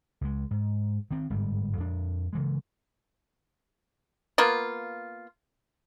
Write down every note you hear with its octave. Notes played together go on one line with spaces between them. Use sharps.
C#2 G#3
G#2
D#3 C4
G1 G#2 G3
F2 D4
C#3 E3 G#3
A#3 B3 F4